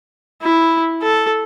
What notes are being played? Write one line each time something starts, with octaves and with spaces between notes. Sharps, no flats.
E4
A4